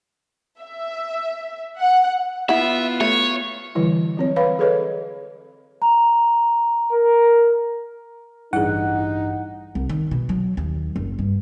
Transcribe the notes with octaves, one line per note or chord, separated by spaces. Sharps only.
E5
F#5
B3 E4 F4 E5 F#5
A3 C#5
D3 E3 G3 E4
F#3 C4 C#5
B4 C#5 F5 B5
G#4 A4 B4 C#5 D#5
A#5
A#4
A1 G2 D#4 E4 G#4 F#5
C2
D#3
B2
F#3
D#2
F#1
G2